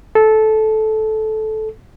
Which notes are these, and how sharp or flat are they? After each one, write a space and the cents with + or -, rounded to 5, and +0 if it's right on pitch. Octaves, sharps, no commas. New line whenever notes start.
A4 -15